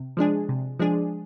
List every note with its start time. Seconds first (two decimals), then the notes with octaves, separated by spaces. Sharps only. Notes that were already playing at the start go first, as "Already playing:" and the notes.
Already playing: C3
0.17 F3 G#3 D4 G#4
0.49 C3
0.79 F3 G#3 D4 G#4